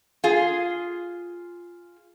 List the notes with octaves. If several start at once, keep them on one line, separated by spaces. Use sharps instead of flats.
F4 G#4